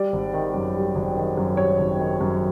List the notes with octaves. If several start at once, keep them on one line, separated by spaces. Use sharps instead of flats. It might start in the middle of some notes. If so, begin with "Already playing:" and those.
Already playing: G3 D5
G#1
D#3
F#2
G3
G#1
D#3
F#2
G3 C#5
G#1
D#3
F#2